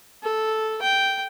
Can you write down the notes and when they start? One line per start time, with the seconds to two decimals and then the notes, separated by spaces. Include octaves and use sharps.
0.23 A4
0.82 G5